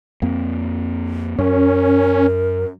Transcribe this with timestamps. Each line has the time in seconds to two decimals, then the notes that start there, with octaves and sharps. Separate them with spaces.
0.22 F2 A#3 C4
1.39 F#2 C#4 A#4